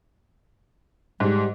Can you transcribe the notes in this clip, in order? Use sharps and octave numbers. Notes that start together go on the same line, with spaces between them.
G#2 G3